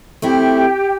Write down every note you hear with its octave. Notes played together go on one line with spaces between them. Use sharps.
A3 C4 E4 G4 G5